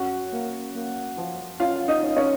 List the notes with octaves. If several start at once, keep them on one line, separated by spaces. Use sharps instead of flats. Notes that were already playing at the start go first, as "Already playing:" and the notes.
Already playing: F#2 F#4 F#5
A#3
A#3
F3
C#4 F4 F5
D#4 D#5
C#4
C#4 C#5